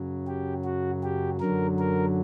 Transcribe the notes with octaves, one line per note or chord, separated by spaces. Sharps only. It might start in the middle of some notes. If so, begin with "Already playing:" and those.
Already playing: F#2 C#3 F#3
G4
F#4
G4
F#2 D3 F#3 A#4
A#4